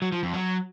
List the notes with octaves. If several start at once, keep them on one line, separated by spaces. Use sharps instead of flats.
F#3
F3
F2
F#3